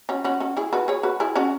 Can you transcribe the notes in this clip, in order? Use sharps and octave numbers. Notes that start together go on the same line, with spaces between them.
C#4 F#4
C#4 F#4
C#4 F#4
E4 G#4
F#4 B4
G#4 C#5
F#4 B4
E4 G#4
C#4 F#4